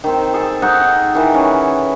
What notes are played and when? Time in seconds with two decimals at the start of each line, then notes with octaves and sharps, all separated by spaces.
0.04 D#3 C4
0.33 G#4 A4 G#5
0.62 D#4 F#5 C#6
1.15 D#3 E3 B4
1.35 C#4